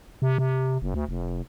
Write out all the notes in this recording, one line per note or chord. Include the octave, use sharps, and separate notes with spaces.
C3
C3
F#1
D2
F1